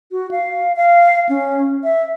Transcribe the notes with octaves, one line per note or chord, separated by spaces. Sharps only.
F#4
F5
F5
C#4
E5